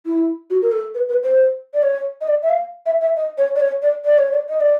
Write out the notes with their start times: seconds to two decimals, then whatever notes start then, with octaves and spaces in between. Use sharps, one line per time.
0.06 E4
0.50 F#4
0.62 A#4
0.72 A4
0.94 B4
1.09 B4
1.23 C5
1.74 D5
1.82 C#5
2.21 D#5
2.28 D5
2.42 E5
2.49 F5
2.86 E5
3.01 E5
3.16 D#5
3.38 C#5
3.55 D5
3.60 C#5
3.82 D5
4.05 D5
4.18 C#5
4.31 D5
4.49 D#5
4.60 D5